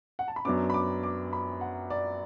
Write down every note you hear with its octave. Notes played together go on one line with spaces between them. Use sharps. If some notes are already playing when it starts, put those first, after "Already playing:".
F#5
A5
B5
F#2 F#3 B3 D4 D6
B5
D6
D6
B5
F#5
D5